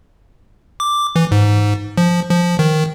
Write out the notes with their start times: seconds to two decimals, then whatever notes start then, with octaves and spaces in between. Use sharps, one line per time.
0.80 D6
1.16 E3
1.31 G#2
1.97 F3
2.30 F3
2.59 D#3